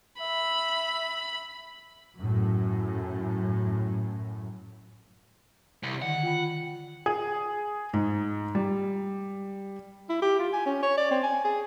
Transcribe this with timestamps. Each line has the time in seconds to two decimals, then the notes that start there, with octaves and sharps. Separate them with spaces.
0.21 E5 B5
2.18 F#2 A2
5.83 C2
6.02 D3 D#3 F#5
6.23 F4 G5 B5
7.06 G#4
7.93 G#2
8.55 G3
10.09 E4
10.22 G4
10.40 F4
10.53 G#5
10.66 C#4
10.83 C#5
10.98 D5
11.11 C4
11.23 G#5
11.45 G#4